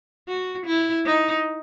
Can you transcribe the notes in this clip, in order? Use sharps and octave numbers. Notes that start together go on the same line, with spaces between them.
F#4
E4
D#4